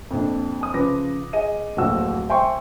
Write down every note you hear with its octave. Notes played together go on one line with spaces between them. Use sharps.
F2 A#2 D4
G#5 D#6
C#3 F3 B4 D6 A#6
G#4 D#5 D#7
D1 A#1 F2 C4 F#4 E6
C5 E5 G5 G#5 C6 C#6